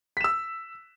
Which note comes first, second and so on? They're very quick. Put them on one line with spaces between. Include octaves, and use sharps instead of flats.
B6 E7 E6